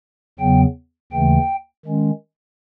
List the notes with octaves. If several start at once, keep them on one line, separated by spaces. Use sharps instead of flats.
E2 C#3 F#3 B3 G5
D#2 C#3 E3 A3 G5
D#3 G#3 C#4